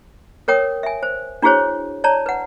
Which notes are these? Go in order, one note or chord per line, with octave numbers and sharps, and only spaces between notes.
A#4 C#5 G5 D#6
E5 G#5
C5
D4 E4 F#4 G#4 C5 C#5
C#5 D5 A5 A#5
B4 F#5